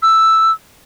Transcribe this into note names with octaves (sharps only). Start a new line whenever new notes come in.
E6